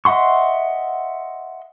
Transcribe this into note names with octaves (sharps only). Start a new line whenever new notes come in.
D#5 E5 F#5 C6 C#6